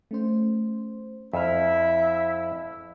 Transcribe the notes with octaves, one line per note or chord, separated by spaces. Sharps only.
A3 C#4 C5
F2 E4 E5 B5 E6 F6